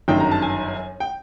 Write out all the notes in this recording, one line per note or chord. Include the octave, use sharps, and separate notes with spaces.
G1 F#2 D#3 G5
A#5
A5
G#5
G5